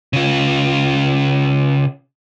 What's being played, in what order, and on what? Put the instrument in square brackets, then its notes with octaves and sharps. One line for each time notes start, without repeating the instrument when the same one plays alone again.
[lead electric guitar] C#3 F4